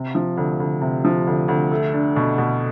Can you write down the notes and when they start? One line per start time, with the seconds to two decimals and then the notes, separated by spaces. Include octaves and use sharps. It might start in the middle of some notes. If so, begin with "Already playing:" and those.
Already playing: C3
0.15 F3
0.37 D2
0.60 D2
0.81 C3
1.05 F3
1.27 D2
1.48 D2
1.71 A3
1.94 D4
2.16 B2
2.38 B2